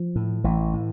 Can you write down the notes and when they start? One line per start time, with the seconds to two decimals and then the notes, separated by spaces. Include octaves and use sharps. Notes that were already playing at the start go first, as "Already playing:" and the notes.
Already playing: F3
0.16 A2
0.44 A1 E3
0.73 A2